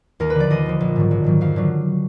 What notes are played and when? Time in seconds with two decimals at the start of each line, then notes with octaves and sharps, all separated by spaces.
0.20 D#2 A#4
0.30 B4
0.35 D3 F3 D5
0.50 D#2 D#5
0.66 D3 F3
0.81 A#1
0.96 G#2 D#3 F#3
1.11 A#1
1.24 G#2 D#3 F#3
1.41 F2 F5
1.56 D3 F#3